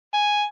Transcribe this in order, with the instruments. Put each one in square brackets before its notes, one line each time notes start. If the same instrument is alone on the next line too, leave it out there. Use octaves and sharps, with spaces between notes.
[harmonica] G#5